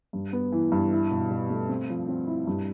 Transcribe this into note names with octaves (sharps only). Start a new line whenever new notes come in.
G2
B3
E3
G2
E4
B2
B2
A3
C4
F3
C4
E4
G2